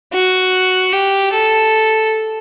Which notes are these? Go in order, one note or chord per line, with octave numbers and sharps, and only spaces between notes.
F#4
G4
A4